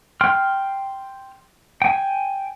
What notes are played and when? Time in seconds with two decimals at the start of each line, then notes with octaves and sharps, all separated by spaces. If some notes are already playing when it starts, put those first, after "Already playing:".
0.21 G5 C6 F6
1.82 G5 G#5